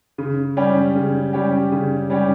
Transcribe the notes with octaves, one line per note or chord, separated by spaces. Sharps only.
C#3
G3 C#4 G4
C#3
G3 C#4 G4
C#3
G3 C#4 G4